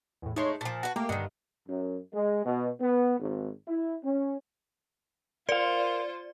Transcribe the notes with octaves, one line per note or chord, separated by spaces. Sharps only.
E2 A2
G#3 A3 D#4 C#5 C6
A#2 F3 A5
F#4 B4
A3 A#3 G4
G2 D3 D#3 D#5
F#2
G#3
B2
B3
G#1
E4
C#4
F4 A#4 C5 D5 F5